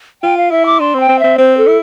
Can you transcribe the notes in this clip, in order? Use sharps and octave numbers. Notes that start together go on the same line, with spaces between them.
F4 G5
F5
E4 E5
D6
D4 C6
C4
G5
C4
C4 E5
C4 C5
A4
E4